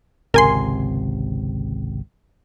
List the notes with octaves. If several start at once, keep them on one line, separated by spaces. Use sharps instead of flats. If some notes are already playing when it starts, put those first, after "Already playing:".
G#1 C#2 C3 A#4 G#5 C6